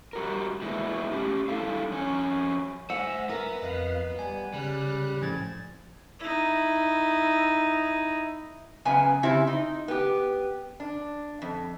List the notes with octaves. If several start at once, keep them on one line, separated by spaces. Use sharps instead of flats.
G3 F#4 A#4
A#2 G#3 B3 E4
A3 C#4 G4
G3 D4 E4 A4 F5
F2 C#4 G#5
C5 E5 F#5 G#5 E6
B3 A#4
F2 B4 D#5 F5
G3 G#5
C#3 G3 F#6
A2 F3 C#4 G#6 A6
D#4 E4
F#2 C#3 B3 G#5
C#3 C4 E4 G4
D#4
B3 G4
D4
F2